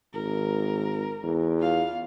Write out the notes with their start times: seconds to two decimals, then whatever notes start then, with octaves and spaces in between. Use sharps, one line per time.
0.13 G#1 A#4
1.24 E2
1.59 F4 F5